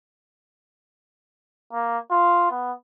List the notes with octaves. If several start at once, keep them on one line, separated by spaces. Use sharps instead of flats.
A#3
F4
B3